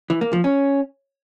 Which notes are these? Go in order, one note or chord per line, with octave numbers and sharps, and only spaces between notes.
E3
A#3
F3
C#4